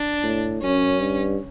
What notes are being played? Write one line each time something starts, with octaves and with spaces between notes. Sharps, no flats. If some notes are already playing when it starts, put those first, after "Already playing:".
Already playing: D4
A2
F#2 C#4
G2